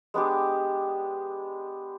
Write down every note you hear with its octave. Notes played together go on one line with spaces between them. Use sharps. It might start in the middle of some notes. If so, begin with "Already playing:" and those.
G#3 B3 D4 G4